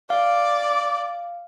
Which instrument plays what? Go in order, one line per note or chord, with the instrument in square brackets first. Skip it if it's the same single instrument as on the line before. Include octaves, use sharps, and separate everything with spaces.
[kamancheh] D5 [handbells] F5